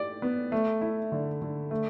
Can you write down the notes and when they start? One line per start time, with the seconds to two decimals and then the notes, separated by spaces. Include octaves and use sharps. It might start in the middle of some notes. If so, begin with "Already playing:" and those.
Already playing: G4 D5
0.22 B3
0.52 A3
0.81 E4
1.12 D3
1.42 D3
1.71 A3